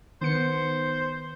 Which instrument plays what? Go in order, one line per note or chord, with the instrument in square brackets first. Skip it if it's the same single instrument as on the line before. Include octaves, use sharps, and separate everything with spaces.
[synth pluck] D#3 B3 C#7 [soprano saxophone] C5